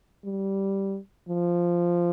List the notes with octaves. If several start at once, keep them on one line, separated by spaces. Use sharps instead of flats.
G3
F3